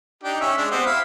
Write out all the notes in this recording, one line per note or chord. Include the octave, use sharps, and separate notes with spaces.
D4 D#4 G4
C#4 E5
G#3 D4
B3 C4 G4
E4 F5